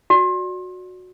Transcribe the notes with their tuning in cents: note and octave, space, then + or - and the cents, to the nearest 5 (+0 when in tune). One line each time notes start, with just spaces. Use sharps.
F#4 -15 D5 +0